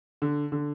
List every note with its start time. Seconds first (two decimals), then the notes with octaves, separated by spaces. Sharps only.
0.22 D3
0.52 D3